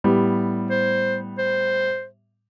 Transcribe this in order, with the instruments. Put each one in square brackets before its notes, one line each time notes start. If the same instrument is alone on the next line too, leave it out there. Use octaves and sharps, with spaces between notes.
[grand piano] A2 G3 B3
[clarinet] C5
C5